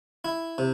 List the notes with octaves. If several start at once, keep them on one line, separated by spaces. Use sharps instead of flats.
E4
C3